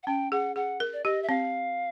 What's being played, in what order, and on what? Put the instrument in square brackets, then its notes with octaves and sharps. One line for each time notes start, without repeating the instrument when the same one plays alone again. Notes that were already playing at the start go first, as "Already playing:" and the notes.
[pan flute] F#5
[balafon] C#4 [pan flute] G5
[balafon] G#4 [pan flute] F#5
[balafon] G#4 [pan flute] F#5
[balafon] A#4
[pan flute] D5
[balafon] G4 [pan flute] D#5
[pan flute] E5
[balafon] C4 [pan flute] F5